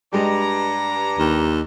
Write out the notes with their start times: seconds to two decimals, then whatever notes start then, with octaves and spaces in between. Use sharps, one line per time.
0.13 G2 G3 G#3 D5 D#5 A#5
1.18 D#2